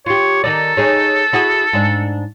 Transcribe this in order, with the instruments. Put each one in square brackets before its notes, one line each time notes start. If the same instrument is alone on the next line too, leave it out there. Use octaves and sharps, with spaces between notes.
[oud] F4 G4 [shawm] C#5
[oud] D#3 D#4 D5 [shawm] A4
[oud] D#4 G#4 C#5
E4 F#4 G#4
G#2 D4